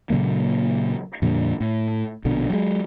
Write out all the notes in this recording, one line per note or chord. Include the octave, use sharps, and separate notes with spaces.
A#2 C#3 F#3 A#3
F2 A#2 D3 G3
A2
A#1 B2 D3
F#3 G#3